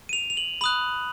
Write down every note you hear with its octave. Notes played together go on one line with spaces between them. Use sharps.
D#7
F7
F7
F#7
B5 D#6 F#6 F#7